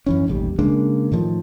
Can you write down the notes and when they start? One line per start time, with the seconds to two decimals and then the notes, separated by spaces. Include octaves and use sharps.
0.06 F#2 E3 C#4
0.26 E1 A1 D#2 G3
0.59 C#3 G#3 A#3 D4
1.12 A2 D#3 F3